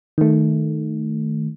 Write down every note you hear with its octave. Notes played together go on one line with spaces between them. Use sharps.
D#3 A3